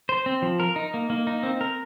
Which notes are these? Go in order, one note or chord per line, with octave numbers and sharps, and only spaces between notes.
C5
C4
F3
A#4
D#4
A#3
A#3
D#4
C4
A#4